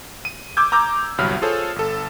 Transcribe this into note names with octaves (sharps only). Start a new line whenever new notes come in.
D#7
D6 E6 G6 G#6
A#5 D6 E6 G6
G1 C2 F#3 B5 F6
F4 G#4 A4 C5 C#5
G1 A4